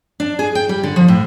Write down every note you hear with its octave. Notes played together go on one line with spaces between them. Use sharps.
D4
G#4
G5
G3
D3
F3
A2